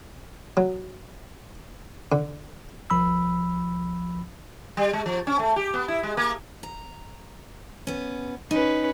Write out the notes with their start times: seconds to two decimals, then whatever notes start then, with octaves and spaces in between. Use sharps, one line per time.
0.57 F#3
2.12 D3
2.90 C2 F3 B5 E6
4.77 G3
4.93 G#3
5.06 F3
5.27 C#4
5.39 A3
5.56 G4
5.74 B3
5.88 E4
6.03 G#3
6.17 A#3
6.63 A#5
7.87 B3 C#4
8.51 C#4 D#4 B4